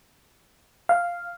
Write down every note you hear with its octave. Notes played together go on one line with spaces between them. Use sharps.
F5